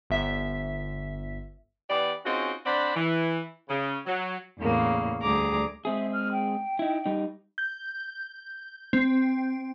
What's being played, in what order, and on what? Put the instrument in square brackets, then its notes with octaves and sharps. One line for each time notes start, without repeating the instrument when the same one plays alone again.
[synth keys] G1 E5 B6
[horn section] E3 B3 G4 D5
C4 C#4 D#4 F4 F#4 G#4
C4 D4 C5 D5 F#5 B5
E3
C#3
F#3
[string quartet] E2 A2 C#3 A#3
D2 G3 G#4 A#5 D6
[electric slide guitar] G#3 C4 G#4 [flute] E5
[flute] F6
G5
[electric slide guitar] D#4 E4
G3 D#4
[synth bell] G6
C4